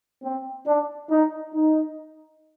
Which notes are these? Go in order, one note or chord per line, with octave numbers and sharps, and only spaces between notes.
C4
D4
D#4
D#4